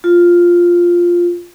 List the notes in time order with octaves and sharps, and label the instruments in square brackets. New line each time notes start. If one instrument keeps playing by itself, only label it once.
[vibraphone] F4